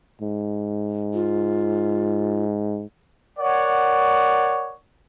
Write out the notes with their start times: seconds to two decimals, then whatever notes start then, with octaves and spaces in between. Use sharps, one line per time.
0.22 G#2
1.14 F4
3.38 A#4 C#5 D5 F#5